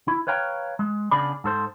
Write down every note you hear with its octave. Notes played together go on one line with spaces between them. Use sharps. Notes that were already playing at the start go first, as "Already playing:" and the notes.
E4
B4 C#5 F5 G5 A#5
G#3
C#3 B3 D4 G#4 D5 B5
G#2 A4 C5